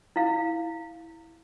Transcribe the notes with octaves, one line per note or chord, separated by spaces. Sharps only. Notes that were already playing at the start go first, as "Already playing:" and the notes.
E4 F5